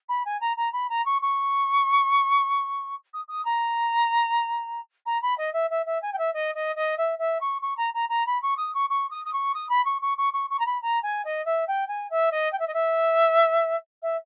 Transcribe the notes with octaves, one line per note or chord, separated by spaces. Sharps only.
B5
G#5
A#5
A#5
B5
A#5
C#6
C#6
D#6
D#6
A#5
A#5
B5
D#5
E5
E5
E5
G#5
G5
E5
D#5
D#5
D#5
E5
E5
C#6
C#6
A#5
A#5
A#5
B5
C#6
D#6
C#6
C#6
D#6
D#6
C#6
D#6
B5
C#6
C#6
C#6
C#6
C#6
A#5
B5
A#5
G#5
D#5
E5
G5
G#5
E5
D#5
G5
E5
D#5
E5
E5